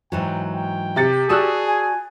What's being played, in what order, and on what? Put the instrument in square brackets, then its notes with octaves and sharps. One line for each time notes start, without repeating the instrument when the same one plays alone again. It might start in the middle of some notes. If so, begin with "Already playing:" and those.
[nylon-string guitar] G#2 E3 F#3 [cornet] G5
[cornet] G5
[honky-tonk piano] C3 A6 C#7 [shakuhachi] G4
[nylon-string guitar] F#4 D5 A5 [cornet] G#4 [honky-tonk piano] D#6 E6 F#6
[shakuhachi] G#5